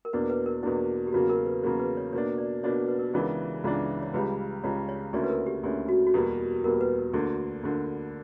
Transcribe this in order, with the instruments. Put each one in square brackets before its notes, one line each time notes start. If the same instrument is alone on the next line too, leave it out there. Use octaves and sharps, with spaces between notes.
[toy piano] A#4
[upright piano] E2 B2 A#3 D4 [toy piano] B4
[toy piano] B4
A#4
[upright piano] E2 B2 A#3 D4 [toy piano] E4
[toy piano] G4
[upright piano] E2 C#3 F#3 A#3 [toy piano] F#4
[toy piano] A#4
B4
[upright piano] E2 C#3 F#3 A#3 [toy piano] C#5
[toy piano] B4
C#5
[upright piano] B2 A#3 D4 [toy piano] C#5
[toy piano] D5
[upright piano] B2 A#3 D4 [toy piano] C#5
[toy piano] B4
A#4
G4
[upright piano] C#2 C#3 E3 B3 D4 [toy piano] A#4
[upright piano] C#2 C#3 E3 B3 D4
[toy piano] C#5
[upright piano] C#2 C#3 G3 [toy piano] B4
[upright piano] C#2 C#3 G3 [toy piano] C#5
[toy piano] C#5
[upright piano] D2 D3 A#3 C#4 E4 [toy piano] C#5
[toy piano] B4
A#4
G4
[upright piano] D2 D3 A#3 C#4 E4 [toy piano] G4
[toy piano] F#4
F#4
[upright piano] E2 B2 G3 A#3 [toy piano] G4
[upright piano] E2 B2 G3 A#3 [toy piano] A#4
[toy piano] B4
A#4
[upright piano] D2 D3 A#3 [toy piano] E4
[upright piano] D2 D3 A#3